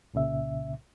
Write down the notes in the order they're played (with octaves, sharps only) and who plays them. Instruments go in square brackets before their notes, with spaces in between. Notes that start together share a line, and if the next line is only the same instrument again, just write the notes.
[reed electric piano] C2 A#2 C#3 E5